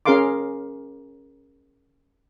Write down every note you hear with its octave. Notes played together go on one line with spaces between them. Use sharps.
C#4 G#4 A#4 F5 C6 D6